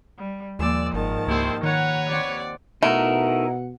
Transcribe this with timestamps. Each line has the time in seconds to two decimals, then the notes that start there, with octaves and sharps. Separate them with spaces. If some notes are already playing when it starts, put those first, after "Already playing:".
0.16 G3
0.59 D#2 A#2 F3 G#3 D5 E6
0.94 G1 G#2 D#3 A5
1.27 C#2 A#3 C4 E4 G4 C5
1.63 D#3 B4 C#5 F#5 A#5
2.09 D#2 C4 D5 F#5
2.83 B2 A3 D#4 E4 A#4 F#5